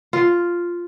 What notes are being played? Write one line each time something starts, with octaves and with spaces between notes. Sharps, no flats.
F4